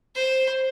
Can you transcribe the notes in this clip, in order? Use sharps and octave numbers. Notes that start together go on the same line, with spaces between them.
C5